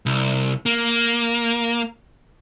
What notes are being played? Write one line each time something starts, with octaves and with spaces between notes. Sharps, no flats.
C2
A#3